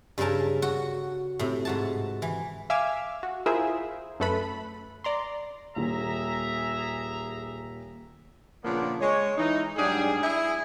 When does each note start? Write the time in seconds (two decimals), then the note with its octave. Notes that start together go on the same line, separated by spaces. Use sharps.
0.18 G2 C#3 A4 A#4 A5
0.62 F#4
1.39 A2 C3
1.65 G#2 F#4 A5
2.22 E3
2.70 E5 F5 G#5 D6 E6 F6
3.23 F#4
3.46 E4 F4 G#4 A#4 C5 E5
4.20 F#2 A3 A4 B4 B5
5.04 D5 A#5 C6
5.76 D#1 G#4 E5 A#5
8.64 A#2 C#3 F3 A#3 B3 D4
9.01 G#3 C#5
9.38 E3 D#4
9.77 G#2 F#3 G3 D4 G#4
10.23 E4 G#4